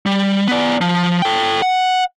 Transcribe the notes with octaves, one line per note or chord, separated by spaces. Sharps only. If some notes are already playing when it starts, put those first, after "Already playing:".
G3
B3 D5
F3
A4 G5
F#5